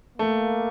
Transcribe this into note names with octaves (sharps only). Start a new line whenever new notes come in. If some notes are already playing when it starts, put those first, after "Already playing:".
A3 A#3